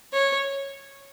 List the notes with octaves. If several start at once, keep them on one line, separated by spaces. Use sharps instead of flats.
C#5